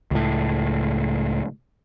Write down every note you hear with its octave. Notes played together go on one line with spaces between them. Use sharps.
C#2 A2